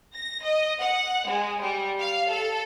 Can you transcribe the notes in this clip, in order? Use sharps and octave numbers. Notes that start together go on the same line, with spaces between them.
A#6
D#5
F#5
G#3
G3
F5
A4